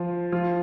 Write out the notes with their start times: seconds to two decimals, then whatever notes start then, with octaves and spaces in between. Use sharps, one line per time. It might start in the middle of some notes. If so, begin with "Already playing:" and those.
Already playing: F3 F4
0.32 F3 F4